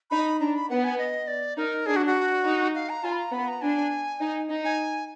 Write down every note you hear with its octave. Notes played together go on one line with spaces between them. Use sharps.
D#4 B5
D4 A#5
B5
B3 F#5
G#5
D#5
D5
D#4 A#4
D4 G#4
F#4
F#4
D#4
F5
A#5
F4 G#5
B5
A#5
B3 B5
A#5
D4 G#5
D#4
D#4
G#5